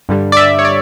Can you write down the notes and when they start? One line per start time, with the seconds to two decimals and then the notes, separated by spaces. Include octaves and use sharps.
0.09 G2 D3 G3
0.32 D5
0.37 E5
0.59 C#5
0.65 D5